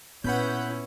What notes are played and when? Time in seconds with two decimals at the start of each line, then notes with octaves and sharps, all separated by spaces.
0.24 A#2 B3 C#4 E4 F#5 B5 G6